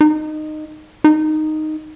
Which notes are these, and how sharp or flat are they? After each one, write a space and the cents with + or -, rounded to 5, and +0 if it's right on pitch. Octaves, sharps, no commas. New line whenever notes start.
D#4 -15
D#4 -5